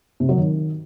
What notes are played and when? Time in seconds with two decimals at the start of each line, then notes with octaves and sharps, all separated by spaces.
0.20 C3
0.29 F#3
0.38 D#3